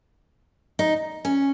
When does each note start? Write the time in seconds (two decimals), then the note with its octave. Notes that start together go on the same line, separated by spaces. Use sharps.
0.79 D#4
1.25 C#4